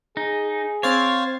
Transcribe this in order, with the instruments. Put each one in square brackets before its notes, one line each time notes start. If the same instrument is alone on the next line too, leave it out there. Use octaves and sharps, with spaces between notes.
[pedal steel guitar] D#4 [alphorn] G#4
[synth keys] C4 A6 C7 [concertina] C5 F5 [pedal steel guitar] C#5